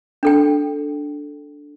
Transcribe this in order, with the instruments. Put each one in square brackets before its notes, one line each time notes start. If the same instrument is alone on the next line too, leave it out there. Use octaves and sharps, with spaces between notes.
[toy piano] D4 A4 G5